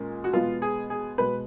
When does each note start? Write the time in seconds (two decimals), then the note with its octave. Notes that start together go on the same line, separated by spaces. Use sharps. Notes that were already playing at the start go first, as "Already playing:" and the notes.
Already playing: A#2 G#3 C#4
0.24 F#4
0.33 B2 G#3 B3 F4
0.62 G#4
0.90 G#4
1.18 B2 G#3 B3 B4